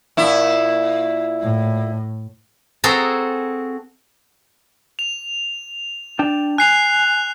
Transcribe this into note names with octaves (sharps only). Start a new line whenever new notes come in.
A#2 E4
A2
C4 F#4 G#4 A4 A#5
F7
D4 G5 A5
G#5 F#6 C7 F7